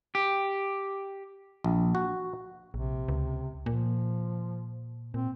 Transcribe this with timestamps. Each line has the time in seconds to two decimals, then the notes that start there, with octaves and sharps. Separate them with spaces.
0.15 G4
1.64 A#1
1.95 F#4
2.74 A#1 C3
3.08 C#2
3.66 A#2 F3
5.14 A#2 C4